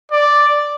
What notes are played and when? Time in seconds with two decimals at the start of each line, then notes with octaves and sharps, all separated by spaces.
0.12 D5